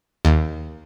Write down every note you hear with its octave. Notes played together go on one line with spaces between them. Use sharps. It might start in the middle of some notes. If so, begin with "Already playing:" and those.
D#2